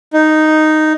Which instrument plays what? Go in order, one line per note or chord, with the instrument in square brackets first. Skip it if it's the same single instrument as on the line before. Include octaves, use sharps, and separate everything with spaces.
[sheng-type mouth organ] D#4